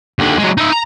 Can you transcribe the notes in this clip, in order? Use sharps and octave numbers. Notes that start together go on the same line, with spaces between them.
D#2 D3
F#3 G#3
D#4 E5
A#5